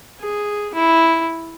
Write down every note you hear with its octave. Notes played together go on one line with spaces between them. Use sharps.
G#4
E4